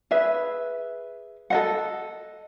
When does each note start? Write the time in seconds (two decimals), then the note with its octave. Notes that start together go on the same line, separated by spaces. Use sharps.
0.11 G#4 B4 E5
1.50 A4 D#5 F#5